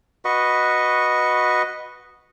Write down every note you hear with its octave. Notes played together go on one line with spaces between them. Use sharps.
F#4 B4 D#5 C#6